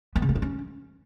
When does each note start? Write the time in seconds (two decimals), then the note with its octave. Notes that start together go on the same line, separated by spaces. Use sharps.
0.16 B3
0.22 C#3
0.29 A#3
0.35 D#4
0.42 C#4